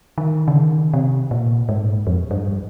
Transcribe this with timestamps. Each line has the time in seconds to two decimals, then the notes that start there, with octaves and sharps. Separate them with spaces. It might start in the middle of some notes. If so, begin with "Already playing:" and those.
0.18 D#3
0.48 C#3
0.56 D#3
0.94 C3
1.31 A#2
1.69 G#2
2.07 F2
2.31 G2